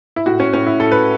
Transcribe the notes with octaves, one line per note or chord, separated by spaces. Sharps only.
E4
A2 F#4
C#4
A2 C#4
E4
A2 A4
B4